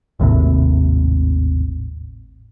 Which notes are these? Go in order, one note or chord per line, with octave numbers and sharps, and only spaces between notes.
G#1 D#2 A2 C3